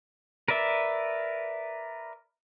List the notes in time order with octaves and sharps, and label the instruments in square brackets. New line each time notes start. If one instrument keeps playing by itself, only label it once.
[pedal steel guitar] A#4 B4 D5 E5